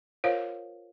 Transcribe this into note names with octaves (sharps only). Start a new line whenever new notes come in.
F4 A#4 C5 C#5 F5